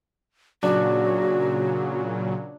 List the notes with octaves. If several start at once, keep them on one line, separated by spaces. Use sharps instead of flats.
A#2 C#3 F#3 D4 F#4